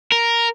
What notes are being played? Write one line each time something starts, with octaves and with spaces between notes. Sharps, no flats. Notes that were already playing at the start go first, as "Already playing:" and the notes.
A#4